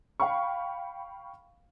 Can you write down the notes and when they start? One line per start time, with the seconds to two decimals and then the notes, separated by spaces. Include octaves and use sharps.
0.20 F5 G5 B5 C#6